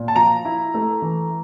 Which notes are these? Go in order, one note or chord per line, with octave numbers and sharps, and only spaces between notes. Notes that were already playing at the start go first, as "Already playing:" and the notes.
Already playing: A#2
A5
F3 A#5
E4
A3
E3